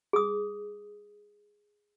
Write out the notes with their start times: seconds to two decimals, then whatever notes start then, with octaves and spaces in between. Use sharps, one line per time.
0.13 G#4 D#6